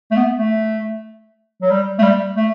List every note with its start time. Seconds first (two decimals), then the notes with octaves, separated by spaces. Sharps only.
0.11 A3
0.17 B3
0.38 A3
1.62 F#3
1.71 G3
1.99 A3
2.03 G3
2.37 A3